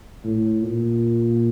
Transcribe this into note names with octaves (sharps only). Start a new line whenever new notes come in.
A2
A#2